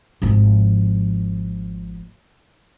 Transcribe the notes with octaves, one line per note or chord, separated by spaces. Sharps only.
G#1 F3